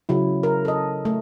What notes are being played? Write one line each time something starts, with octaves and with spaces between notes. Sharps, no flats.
C#3 F#3 E4
A#4
A4 D#5
A3